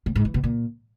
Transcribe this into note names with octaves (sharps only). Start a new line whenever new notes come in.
A2
G#2
E3
B2
A#2